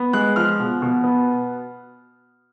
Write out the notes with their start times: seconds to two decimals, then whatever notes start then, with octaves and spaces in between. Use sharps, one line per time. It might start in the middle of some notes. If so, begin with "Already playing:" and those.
Already playing: B3
0.13 G#3 F#6
0.36 F3 F6
0.60 B2
0.82 B2
1.04 B3